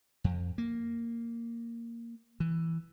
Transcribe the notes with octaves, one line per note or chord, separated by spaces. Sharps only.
F2
A#3
E3